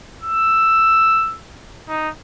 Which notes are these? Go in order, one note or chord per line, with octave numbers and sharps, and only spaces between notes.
E6
D#4